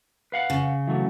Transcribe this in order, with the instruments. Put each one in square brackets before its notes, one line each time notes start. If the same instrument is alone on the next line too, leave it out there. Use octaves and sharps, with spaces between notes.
[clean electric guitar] B4 F5 F#5
[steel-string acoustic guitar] C#3
[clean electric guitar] E3 F#3 A3